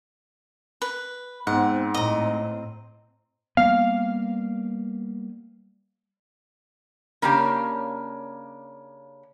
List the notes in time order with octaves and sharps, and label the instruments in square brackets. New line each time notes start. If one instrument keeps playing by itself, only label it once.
[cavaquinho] B4
[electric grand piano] G#2 [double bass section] B3 C4 [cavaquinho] F#5
[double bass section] A2 C4 [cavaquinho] D#5 A#5
[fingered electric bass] G3 A#3 B3 [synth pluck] F5
[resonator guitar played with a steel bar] C#3 A#3 C#4 D4 G4